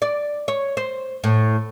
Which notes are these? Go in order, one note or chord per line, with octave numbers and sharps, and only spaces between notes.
D5
C#5
C5
A2